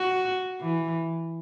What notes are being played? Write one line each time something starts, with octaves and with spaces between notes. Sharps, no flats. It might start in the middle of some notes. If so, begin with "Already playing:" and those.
Already playing: F#4
E3